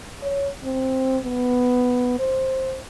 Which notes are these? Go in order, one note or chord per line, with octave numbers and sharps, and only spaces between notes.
C#5
C4
B3
C5